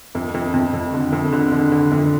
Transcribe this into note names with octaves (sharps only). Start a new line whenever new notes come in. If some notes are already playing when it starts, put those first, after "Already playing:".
F2
F2
F2
F2
D3
F2
D3
D3
D3
F2